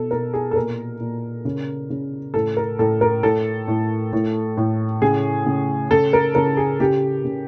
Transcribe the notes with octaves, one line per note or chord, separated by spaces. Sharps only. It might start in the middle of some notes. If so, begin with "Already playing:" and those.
Already playing: B2 A4
B2 A#4
G#4
A4
A#2 A#4
A#2
C#3
C#3
A2 A4
A#4
A2 A4
A#4
A2 A4
A2
A2
A2
C#3 G#4
C#3
C#3 A4
A#4
C#3 A#4
G#4
C#3 G4
C#3